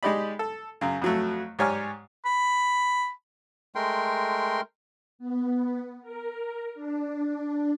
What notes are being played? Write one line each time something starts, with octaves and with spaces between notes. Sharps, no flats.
G#3 D#4 G4 D5 B5
A4
F#2 C#3
F2 F#3 A3
G#2 G4 C#5 D5 G#5 F6
B5
G#3 A3 A#4 G5 C6
B3
A#4
D4